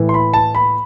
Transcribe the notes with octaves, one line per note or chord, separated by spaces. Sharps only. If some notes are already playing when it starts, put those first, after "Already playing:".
Already playing: A2 E3
C6
B5
A5
B5